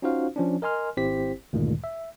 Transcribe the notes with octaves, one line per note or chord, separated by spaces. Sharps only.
C#4 D#4 F4 F#4 C5 F5
F3 C#4 D4
A#4 D#5 G#5 C6 F6
G#1 C4 E4 G4 C5 B6
D2 G2 A#2 D#3 G#3
E5